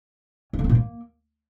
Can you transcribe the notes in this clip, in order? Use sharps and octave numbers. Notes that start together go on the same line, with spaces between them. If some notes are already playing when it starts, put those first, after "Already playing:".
C#4
D3
C4
A#2
A#3